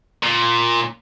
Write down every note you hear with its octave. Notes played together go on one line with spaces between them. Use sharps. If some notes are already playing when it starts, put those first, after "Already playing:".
A#2